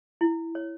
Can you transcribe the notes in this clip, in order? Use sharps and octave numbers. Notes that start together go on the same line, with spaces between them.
E4
C#5